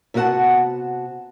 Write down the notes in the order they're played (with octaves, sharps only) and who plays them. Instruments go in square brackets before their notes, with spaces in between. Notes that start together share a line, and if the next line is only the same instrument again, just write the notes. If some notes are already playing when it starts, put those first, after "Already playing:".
[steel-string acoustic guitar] C3 B3 F#4 A#4 F#5 A5